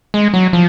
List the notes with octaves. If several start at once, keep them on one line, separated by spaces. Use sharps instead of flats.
G#3
F#3
F3